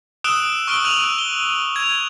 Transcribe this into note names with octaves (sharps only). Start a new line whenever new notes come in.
D#6 E6 F#6 D7 E7 G7
C#6 E6 F6 D7 G7
F#6 D7 D#7 F7 F#7
G7
G#6 F7